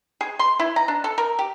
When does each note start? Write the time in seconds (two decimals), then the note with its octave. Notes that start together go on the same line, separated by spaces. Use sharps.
0.21 G#4
0.39 C6
0.60 E4
0.76 A#5
0.88 D4
1.04 A4
1.18 A#4
1.39 G4